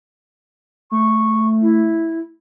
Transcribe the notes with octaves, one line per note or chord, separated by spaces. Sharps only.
A3 C#6
E4